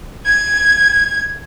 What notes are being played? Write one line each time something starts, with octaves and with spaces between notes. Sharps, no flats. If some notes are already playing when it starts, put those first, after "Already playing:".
G#6